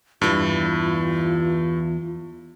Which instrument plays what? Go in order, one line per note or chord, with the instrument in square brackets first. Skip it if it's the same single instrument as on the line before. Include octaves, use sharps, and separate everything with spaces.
[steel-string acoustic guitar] E2 E3 [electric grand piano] G2 [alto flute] F4